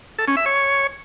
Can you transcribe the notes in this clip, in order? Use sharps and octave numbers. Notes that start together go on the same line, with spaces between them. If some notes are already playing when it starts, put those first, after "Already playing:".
A4
C#4
E5
C#5